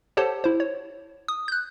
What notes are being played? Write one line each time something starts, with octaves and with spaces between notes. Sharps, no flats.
G4 A4 C5 C#5 F#5 A5
E4 C5
C#5
D#6
F#6 G6